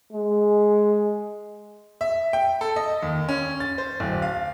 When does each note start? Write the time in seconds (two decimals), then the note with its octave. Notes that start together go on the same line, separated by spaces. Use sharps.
0.13 G#3
2.01 E5
2.33 G5
2.61 A4
2.76 D#5
3.03 D#2
3.29 C#4
3.60 A6
3.78 C5
4.00 D1
4.22 F5